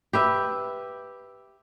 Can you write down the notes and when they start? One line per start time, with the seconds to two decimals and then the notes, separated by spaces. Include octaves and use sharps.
0.13 G4 B4 E5